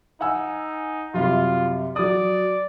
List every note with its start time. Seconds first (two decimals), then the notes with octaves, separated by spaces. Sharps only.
0.21 D#4 F#5 G#5 E6
1.14 F#2 C3 G3 F4
1.96 F#3 D5 D#6